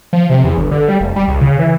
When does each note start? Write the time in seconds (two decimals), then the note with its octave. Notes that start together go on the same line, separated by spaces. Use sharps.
0.13 F3
0.30 C3
0.44 E2
0.57 G1
0.71 D3
0.88 G3
1.00 F1
1.16 G3
1.28 C#2
1.41 C#3
1.59 E3